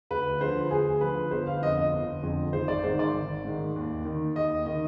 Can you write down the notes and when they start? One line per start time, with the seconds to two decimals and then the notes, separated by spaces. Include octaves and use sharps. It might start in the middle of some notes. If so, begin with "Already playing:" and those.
0.10 D2 B4
0.41 D3 F3 C5
0.71 D2 G#4
1.01 D3 F3 B4
1.31 G1 C5
1.47 F5
1.62 F2 D3 D#5
1.77 D#5
1.93 G1
2.22 F2 D3
2.53 G#1 C5
2.68 D5
2.84 G#2 D#3 C5
2.99 D5
3.14 G#1
3.45 G#2 D#3
3.76 D#2
4.05 D#3
4.36 D#2 D#5
4.66 D#3 D#5